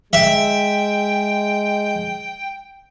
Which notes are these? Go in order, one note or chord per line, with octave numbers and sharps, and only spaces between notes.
G#3 E5 G5